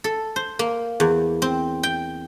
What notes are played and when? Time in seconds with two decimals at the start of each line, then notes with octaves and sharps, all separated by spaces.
0.04 A4
0.36 C5
0.59 A#3
1.00 E2
1.42 C4
1.83 G5